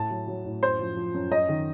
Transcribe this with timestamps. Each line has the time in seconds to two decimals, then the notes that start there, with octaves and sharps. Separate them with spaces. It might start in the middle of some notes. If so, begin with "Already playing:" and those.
Already playing: A2 A5
0.10 F#3
0.28 F#3
0.45 A2
0.62 F#2 C5
0.80 F3
0.97 F3
1.14 F#2
1.32 F#2 D#5
1.49 D#3